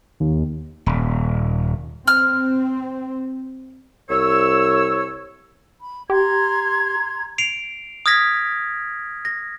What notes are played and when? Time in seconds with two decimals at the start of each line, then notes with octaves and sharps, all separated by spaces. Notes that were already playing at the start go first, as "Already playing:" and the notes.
0.20 D#2
0.86 D#1
2.07 C4 F6
4.09 C2 C#5 E6
5.80 B5
6.10 G4 A#5 C6 G#6
7.38 C7 D7 F7
8.06 D#6 F6 G#6 A#6 B6
9.25 A#6